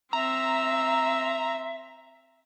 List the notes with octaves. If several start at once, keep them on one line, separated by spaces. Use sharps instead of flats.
C4 E5 A#5 E6